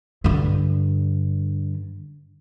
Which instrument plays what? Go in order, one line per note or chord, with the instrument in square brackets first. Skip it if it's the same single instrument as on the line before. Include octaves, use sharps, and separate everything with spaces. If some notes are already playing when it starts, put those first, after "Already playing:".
[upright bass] G2 D3